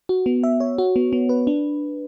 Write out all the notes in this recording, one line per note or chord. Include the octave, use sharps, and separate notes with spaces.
F#4
B3
E5
C#5
F#4
B3
B3
B4
D4